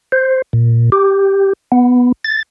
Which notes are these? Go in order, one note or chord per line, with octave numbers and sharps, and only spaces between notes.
C5
A#2
G4
B3
A6